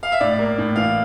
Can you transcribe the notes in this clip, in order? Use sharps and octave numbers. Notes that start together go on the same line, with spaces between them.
F5
E5
A2 D5
A#3
A2
E3 F5